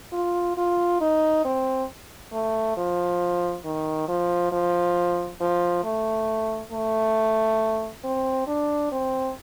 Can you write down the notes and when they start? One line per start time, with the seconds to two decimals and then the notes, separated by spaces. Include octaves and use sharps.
0.13 F4
0.57 F4
1.01 D#4
1.44 C4
2.32 A3
2.77 F3
3.65 D#3
4.08 F3
4.52 F3
5.40 F3
5.84 A3
6.72 A3
8.04 C4
8.47 D4
8.92 C4